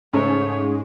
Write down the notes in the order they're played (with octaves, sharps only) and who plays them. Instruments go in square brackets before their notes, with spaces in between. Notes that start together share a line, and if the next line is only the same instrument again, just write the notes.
[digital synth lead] G#2 [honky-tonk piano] C#3 A3 [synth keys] C#4 [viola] C#5